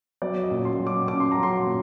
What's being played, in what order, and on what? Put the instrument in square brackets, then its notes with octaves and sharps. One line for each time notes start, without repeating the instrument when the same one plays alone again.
[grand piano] F#3 D5
D#5
A#2
C6
F#3
D6
A#2 D6
C6
A#5
F#3
C6
A#2